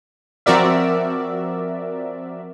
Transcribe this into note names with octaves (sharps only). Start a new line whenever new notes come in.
F3 C4 F#4 A#4 D5 E5